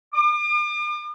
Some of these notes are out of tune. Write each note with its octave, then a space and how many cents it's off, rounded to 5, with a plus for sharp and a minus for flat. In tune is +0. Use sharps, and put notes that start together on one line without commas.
D6 +40